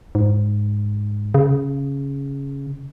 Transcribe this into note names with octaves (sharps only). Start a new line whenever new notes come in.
G#2
C#3